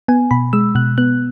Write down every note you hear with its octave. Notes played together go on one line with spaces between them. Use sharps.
B3 G#5
B2 B5
G#3 E6
B2 F#6
B3 F#6